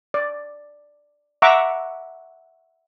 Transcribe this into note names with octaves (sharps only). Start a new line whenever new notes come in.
D5
E5 F#5 A#5 C#6 D6